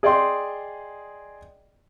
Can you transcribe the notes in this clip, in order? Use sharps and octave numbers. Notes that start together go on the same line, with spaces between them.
G#4 D5 D#5 G5 C6